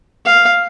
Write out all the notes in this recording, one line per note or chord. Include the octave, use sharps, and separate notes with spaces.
F5